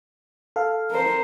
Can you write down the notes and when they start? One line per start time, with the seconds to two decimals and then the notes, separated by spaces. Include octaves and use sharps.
0.56 A4 F5
0.91 A#4 C5